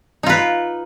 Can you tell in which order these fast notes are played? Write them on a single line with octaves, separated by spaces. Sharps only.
D#4 F4 B4